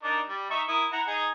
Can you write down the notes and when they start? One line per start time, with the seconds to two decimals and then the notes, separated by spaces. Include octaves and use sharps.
0.03 D4 D#4 A#4
0.28 G3
0.51 D#4 E5 C#6
0.68 E4 A#4 D#6
0.92 E4 F#5 A#5
1.07 D#4 G#4